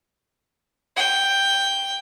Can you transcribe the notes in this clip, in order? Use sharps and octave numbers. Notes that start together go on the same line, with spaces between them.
G5